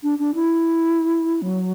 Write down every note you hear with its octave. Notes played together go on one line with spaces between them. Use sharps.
D4
D4
E4
F#3